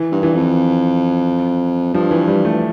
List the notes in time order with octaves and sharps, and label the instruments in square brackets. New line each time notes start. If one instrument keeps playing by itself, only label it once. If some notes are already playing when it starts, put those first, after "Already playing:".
Already playing: [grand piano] E3
[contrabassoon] G2
[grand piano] E3
[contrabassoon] F2
[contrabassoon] G2 [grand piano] F3
[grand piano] E3
G3
A3